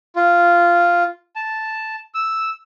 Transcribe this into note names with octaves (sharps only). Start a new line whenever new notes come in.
F4
A5
E6